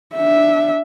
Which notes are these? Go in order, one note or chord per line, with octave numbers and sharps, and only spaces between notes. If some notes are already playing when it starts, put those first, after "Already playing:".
D4 E5